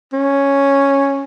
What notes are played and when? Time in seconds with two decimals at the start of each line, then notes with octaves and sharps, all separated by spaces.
0.13 C#4